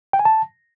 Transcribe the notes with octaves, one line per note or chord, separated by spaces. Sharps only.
G5
G#5
A5